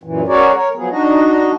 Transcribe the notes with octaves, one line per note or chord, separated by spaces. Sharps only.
F#2 A#2 E3
C#4 F#4 G#4 A#4 C#5 D5
A#4 C#5
F3 F#3 B3 G#4
D4 D#4 F#4 D#5